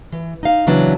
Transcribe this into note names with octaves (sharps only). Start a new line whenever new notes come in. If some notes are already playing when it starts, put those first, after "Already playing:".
E3
D#4 F5
C#3 E3 F#3 B3 D4